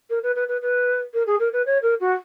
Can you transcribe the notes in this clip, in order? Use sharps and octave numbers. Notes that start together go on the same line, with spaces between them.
A#4
B4
B4
B4
B4
A#4
G#4
A#4
B4
C#5
A#4
F#4